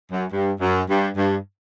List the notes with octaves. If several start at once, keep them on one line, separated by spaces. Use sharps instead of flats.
F#2
G2
F#2
G2
G2